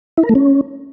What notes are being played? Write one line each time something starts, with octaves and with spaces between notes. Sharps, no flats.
E4
A#4
A3
C#4